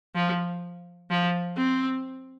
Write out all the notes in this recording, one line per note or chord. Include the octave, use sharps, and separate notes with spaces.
F3
F3
C4